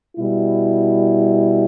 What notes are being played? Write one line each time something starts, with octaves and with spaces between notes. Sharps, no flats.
B2 G3 E4